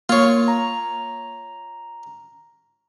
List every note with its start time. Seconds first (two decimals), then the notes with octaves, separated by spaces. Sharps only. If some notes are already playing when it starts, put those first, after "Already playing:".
0.09 A#3 F4 C#5
0.48 A#5